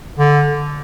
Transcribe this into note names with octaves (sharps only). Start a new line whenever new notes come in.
D3